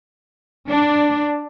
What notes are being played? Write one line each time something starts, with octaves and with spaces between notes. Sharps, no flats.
D4